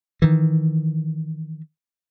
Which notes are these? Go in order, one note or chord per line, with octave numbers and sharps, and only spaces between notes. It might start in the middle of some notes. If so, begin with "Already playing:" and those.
D#3 E3